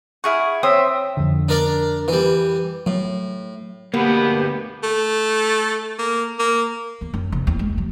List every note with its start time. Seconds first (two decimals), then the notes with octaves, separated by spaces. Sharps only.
0.24 E4 G#4 F#5 C#6 F6
0.63 C4 C#5 E5 D#6
1.17 F2 D3
1.49 D4 A#4 D5
2.08 E3 G3
2.86 A2 F#3
3.94 D2 B2 A#3 B3 G4
4.84 A3
5.99 A#3
6.39 A#3
7.01 E2
7.14 F#2
7.32 F1
7.47 E2
7.59 G#3
7.78 F#3